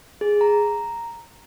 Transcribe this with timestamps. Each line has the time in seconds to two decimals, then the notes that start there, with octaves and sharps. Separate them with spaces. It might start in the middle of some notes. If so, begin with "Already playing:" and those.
0.21 G#4
0.41 A#5